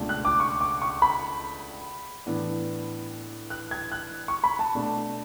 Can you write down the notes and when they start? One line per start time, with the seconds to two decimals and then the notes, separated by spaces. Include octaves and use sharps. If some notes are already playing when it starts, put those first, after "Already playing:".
Already playing: C#2 B2 A3 D4
0.09 F#6
0.25 D6
0.40 C#6
0.61 D6
0.82 C#6
1.02 B5
2.26 A2 E3 B3 D4
3.50 F#6
3.71 G#6
3.92 F#6
4.28 C#6
4.44 B5
4.59 A5
4.75 B2 A3 D4